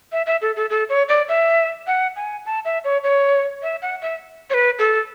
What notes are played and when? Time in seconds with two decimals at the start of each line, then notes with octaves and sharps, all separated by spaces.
0.12 E5
0.26 E5
0.42 A4
0.56 A4
0.70 A4
0.89 C#5
1.09 D5
1.29 E5
1.87 F#5
2.16 G#5
2.46 A5
2.65 E5
2.84 C#5
3.04 C#5
3.62 E5
3.82 F#5
4.02 E5
4.50 C#5
4.54 B4
4.79 A4